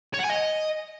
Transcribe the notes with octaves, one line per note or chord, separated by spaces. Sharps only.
C#5
F#5
G#5
D#5